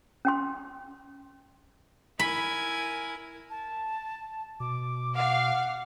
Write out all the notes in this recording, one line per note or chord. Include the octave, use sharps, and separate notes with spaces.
C#4 G5 C6
E4 A#4 G#5 B5
A5
B2 D6
F5 F#5